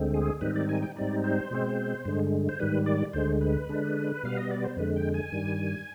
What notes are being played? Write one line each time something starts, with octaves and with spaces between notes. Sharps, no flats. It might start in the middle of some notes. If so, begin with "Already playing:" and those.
Already playing: D2 D3 G#3 C4
G#4
G#2 D#3 G3 C4 D#4 B4
D5
G#5
G5
G#2 G3 C4 D#4 D5
C5
B2 G#3 C4
G2 D3 G#3
C5
G#2 D#3 G3 B4
D5
D2 D3 G#3 C5
B4
D3 G#3 D4
B2 G3 B3 F5
D#5
D5
C5
F2 D3 G#3 B4
G5
G#5
G2 D#3 G3